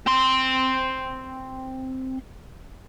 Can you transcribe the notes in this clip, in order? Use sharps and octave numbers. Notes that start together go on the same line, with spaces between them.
C4 C6